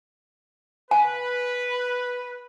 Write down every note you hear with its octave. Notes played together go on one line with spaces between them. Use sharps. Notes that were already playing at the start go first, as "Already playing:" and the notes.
B4 G#5